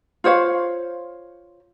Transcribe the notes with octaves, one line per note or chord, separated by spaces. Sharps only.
F4 C5 C#5 F5